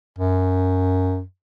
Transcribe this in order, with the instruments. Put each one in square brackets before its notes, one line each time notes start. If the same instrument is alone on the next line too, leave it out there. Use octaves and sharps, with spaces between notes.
[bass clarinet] F#2